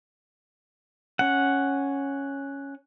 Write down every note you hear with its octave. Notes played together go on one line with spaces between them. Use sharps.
C#4 F#5